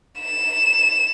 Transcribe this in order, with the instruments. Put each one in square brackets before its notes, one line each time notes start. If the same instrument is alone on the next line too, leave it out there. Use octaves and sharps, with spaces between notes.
[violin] E7